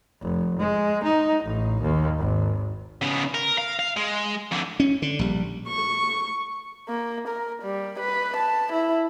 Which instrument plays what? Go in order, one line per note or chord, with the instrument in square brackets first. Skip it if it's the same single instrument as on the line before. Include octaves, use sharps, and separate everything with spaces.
[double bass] F1
G#3
D#4
A1
D#2
G#1
[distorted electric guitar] C#3 B3
A#4
F5
F5
G#3
F2 D3
[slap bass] C#4
D3
A#1 G3
[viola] C#6
[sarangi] A#3
A#4
G3
B4
A5
E4